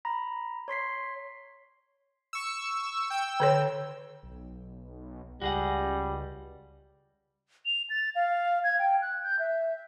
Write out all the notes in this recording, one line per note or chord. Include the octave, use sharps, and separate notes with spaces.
A#5 B5 A#6
C#5 C6 B6 C7
C#6 E6
G5 E6
D3 A4 C#5
B1
C#2 G3 F#4 G#4 F#5
F7
A6
F5
G#6
G5
F#6
G6
E5